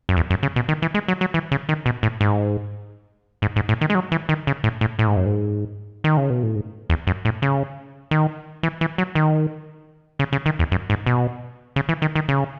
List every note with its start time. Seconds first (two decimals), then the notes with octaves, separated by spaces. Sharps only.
0.09 F#2
0.17 E2
0.30 F#2
0.43 C#3
0.56 B2
0.69 D#3
0.82 E3
0.94 G#3
1.08 F#3
1.21 F#3
1.34 E3
1.52 C#3
1.69 D#3
1.86 B2
2.03 A2
2.21 G#2
3.42 G#2
3.56 G#2
3.69 A2
3.81 D#3
3.90 G#3
3.95 F#3
4.12 E3
4.29 D#3
4.47 C#3
4.64 A2
4.81 A2
4.99 A2
5.07 G#2
5.17 F#2
5.26 G#2
6.04 D#3
6.17 C#3
6.30 B2
6.43 A2
6.56 G#2
6.90 E2
7.07 F#2
7.25 A2
7.42 C#3
8.11 D#3
8.63 E3
8.81 E3
8.98 F#3
9.15 D#3
10.19 C#3
10.33 C#3
10.46 D#3
10.59 E2
10.72 F#2
10.90 G#2
11.06 B2
11.76 C#3
11.89 E3
12.02 D#3
12.15 D#3
12.28 C#3